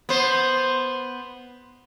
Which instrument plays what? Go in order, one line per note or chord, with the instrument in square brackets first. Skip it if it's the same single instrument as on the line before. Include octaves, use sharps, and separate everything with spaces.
[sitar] B3 C5